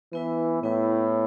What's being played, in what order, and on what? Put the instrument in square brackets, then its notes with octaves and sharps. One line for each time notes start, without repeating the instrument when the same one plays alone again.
[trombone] E3 [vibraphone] B3 E4 B4
[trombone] A2 [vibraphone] B3 E4 B4